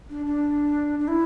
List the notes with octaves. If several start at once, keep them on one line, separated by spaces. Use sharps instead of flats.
D4
D4
D4
E4